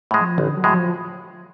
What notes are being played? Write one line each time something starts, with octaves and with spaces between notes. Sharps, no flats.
A2 G#3
F3
A1 D3
F#3
A2 G#3
F3